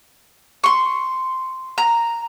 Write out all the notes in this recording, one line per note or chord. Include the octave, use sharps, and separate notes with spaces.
C6 C#6
A#5